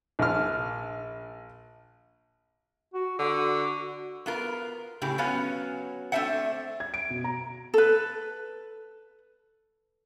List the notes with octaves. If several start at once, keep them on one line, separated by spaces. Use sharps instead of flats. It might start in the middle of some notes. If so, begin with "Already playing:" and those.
A#1 F6
F#4
D3 F#4
B3 F4 A#4
A2 C#3 G4 G#4
F#3 B3 C#4 F5
A3 C4 D4 C5 E5 F#5
G#6
D7
B2
A#5
A4 B4